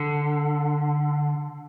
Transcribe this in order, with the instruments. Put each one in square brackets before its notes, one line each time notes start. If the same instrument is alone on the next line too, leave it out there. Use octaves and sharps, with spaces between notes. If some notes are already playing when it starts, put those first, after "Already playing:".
Already playing: [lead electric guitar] D3